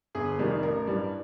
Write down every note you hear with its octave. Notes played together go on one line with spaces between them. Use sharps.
G1 G#4
F2 C3 D#3 G3
A1 A#4
G2 E3 G3